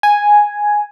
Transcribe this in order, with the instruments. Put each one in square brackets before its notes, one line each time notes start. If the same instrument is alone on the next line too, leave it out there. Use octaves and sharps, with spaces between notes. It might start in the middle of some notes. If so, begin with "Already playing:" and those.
[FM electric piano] G#5